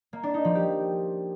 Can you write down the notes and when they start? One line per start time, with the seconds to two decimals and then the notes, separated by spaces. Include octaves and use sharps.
0.13 A#3
0.23 D4
0.34 D#4
0.45 F3
0.55 G4